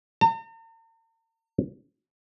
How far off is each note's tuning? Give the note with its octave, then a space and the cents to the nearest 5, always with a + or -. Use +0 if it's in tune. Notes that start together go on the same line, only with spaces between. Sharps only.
A#5 -45